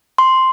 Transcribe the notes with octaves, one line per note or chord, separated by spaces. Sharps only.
C6